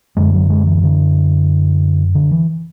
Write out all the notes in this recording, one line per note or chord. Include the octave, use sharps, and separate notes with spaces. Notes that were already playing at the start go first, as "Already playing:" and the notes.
F#2 D3 G#3
F#3
G#3
E3
D3
D3
E3